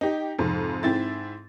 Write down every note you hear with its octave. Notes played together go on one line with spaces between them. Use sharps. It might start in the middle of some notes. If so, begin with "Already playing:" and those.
D#4 G4
F2 G#2 C3
G#2 C4 E4 A6